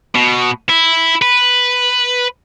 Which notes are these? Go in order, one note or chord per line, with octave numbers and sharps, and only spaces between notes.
B2
E4
B4